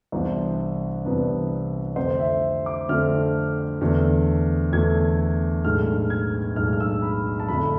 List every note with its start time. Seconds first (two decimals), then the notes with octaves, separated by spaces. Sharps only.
0.12 C2 C3 E3 B3 D4 C5
1.05 C2 C3 E3 B3 D4 B4
1.96 F2 D3 A3 C4 C5
2.19 E5
2.66 D6
2.89 F2 D3 A3 C4 F6
3.81 E2 D3 A3
4.72 E2 D3 A3 G#6
5.65 B1 A2 G#3 D4 F6
6.10 G#6
6.56 B1 A2 G#3 D4 F6
6.73 F6
6.80 E6
7.02 B5
7.40 A5
7.48 F2 D3 A3 D4 B5